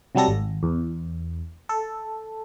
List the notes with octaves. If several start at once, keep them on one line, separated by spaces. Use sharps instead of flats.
C3 F#3 G3 A4 A#6
G#1
E2
A4